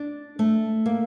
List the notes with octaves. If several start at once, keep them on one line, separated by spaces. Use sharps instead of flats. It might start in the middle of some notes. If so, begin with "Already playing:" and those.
Already playing: D4
A3
A#3